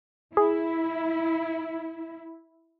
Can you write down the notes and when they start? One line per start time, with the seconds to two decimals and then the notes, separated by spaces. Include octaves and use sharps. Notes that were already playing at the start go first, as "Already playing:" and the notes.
0.37 E4 G#4